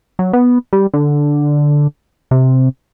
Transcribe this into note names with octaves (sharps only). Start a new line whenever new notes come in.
F#3
B3
G3
D3
C3